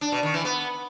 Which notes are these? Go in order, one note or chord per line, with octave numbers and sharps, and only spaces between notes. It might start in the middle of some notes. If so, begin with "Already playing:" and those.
D4
B2
D#3
E3
B3